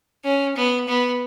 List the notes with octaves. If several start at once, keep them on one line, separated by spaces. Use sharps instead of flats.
C#4
B3
B3